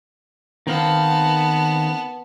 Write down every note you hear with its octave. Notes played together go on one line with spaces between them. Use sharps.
D#3 B3 C4 F5 A5